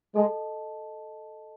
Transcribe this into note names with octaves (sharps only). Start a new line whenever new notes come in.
G#3 A4 D#5 A5